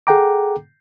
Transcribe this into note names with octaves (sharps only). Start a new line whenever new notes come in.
G#4 A4 F#5 G5 A#5 D6